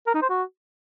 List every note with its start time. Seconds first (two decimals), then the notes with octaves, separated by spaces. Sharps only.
0.07 A#4
0.15 D#4
0.22 C5
0.30 F#4